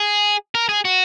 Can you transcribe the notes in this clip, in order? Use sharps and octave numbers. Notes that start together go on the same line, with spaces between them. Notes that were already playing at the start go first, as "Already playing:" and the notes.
Already playing: G#4
A#4
G#4
F#4